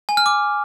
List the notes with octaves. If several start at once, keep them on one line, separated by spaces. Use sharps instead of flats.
G#5
F6
D6